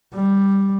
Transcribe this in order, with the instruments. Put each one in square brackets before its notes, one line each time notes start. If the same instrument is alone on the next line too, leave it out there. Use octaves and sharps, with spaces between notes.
[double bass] G3